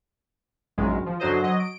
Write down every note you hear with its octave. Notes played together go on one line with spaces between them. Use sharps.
A#1 F#2 A2 D#3 G#3
F3
F#2 D3 F#3 C5 D#5
F#3 D#5
D7